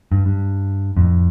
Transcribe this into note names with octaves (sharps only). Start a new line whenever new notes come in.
G2
G2
F2 A2